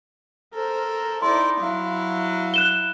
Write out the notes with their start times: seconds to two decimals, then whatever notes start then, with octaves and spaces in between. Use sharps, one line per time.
0.53 A4 A#4 C5
1.22 D#4 E4 D5 C6
1.59 F#3 E4 F5
2.54 F#6 E7 G7